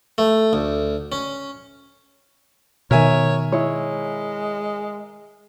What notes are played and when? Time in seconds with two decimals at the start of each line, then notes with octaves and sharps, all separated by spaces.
0.18 A3
0.53 D2
1.12 C#4
2.91 B2 D#3 A#4 C#5 E5 G#5
3.52 G#3 E4 C#5